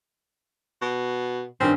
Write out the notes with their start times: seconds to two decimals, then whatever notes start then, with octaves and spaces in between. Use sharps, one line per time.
0.82 B2
1.60 G2 D#3 C4 C#4